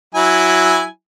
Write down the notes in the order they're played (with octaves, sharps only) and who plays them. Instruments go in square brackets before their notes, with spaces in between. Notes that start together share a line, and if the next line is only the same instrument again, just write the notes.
[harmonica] F#3 E4 G#5